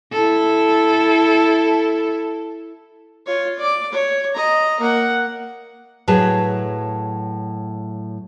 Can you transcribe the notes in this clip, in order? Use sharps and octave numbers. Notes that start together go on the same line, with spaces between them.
E4 A4
F4 C#5
D5 D6
C#5
D#5 A#5
A#3 F#5
A2 F#3 G#4 B4 A5